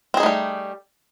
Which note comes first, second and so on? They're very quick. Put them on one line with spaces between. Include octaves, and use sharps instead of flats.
C4 G#4 D#4 A3 G3